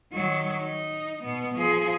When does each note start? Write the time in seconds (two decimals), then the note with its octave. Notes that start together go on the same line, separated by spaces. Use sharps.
0.13 D#3 F#3
0.63 D#4
1.23 B2 B3
1.55 F3 G#4